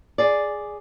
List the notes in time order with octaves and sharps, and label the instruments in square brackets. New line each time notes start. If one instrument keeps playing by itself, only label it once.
[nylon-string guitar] G#4 D5